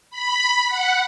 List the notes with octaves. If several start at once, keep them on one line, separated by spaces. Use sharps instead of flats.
B5
F#5